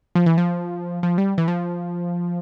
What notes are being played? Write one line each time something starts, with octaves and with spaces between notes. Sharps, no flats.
F3
E3
F3
F3
G3
E3
F3